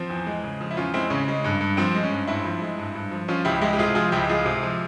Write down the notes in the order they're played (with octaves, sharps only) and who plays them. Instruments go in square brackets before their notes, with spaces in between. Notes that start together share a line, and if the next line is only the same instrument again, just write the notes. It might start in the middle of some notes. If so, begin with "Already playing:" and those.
Already playing: [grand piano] F3 C4
E2
G#3
C#3
F3
E4
E2 C#4 F4
G#3 C4 E4
C#3 C#4
G#3
G2
G2
F3 C4
G#3
C#4
G2
G2 C4 E4
F3
G#3
G2
G2
F3
F3 C#4 F4
C#2 E4 G4
G#3 E4 G4
G4
C3 F4 G#4
F3 F4 G#4
C#2 E4 G4
G#3 F4 G#4
C3
F3